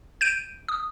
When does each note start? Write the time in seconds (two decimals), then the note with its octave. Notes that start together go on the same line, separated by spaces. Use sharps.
0.21 G6 D7 D#7
0.68 D#6